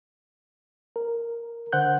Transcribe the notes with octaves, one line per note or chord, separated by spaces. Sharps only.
A#4
D3 C5 F#5 F#6 G6